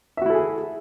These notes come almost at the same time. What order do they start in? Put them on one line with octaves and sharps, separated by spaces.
E5 F#4 E4 A4 G#4